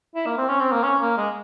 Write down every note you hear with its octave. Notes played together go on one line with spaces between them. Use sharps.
E4
A#3
C4
C#4
C4
A#3
C#4
A#3
G#3